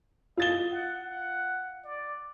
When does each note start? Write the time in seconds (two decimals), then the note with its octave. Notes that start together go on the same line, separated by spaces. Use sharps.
0.37 F4 D#5 A6 G7
0.71 F#5
1.03 F#5
1.85 D5